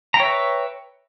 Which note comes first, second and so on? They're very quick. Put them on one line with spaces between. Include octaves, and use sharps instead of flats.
A#5 G5 C#5 E5 B4